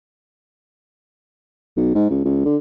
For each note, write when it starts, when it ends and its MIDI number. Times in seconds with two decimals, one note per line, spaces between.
1.77 1.91 35
1.95 2.06 44
2.10 2.23 37
2.25 2.41 37
2.45 2.57 50